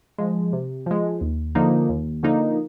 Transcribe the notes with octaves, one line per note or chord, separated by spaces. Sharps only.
F3 G#3
C3
F3 G#3
D#2
D3 F3 A#3 D#4
D#2
D3 F3 A#3 D#4